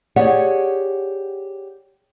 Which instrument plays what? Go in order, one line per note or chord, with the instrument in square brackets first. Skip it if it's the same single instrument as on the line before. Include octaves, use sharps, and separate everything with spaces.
[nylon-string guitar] G4 G#4 C#5 D5 F#5